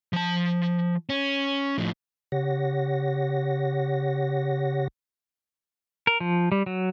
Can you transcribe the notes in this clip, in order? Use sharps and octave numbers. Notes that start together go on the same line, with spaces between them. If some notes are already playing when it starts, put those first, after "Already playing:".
F3 A5
C#4
A2 F3
C#3 G4 C#5 F#5 A#6
A#4
F3
G3
F#3